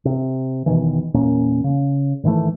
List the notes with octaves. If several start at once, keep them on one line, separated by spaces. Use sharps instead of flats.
C3
E1 B2 D#3 E3
E2 A#2 A#3 C#4
C#3
G#2 D#3 E3 A3